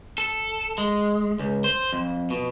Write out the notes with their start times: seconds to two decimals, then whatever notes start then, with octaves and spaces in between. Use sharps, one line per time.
0.18 A4
0.78 G#3
1.39 C#2
1.64 C5
1.93 F2
2.30 B2